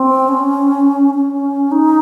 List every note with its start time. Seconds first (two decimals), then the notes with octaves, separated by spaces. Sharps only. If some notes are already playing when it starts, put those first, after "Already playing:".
Already playing: C4
0.28 C#4
1.14 C#4
1.71 D#4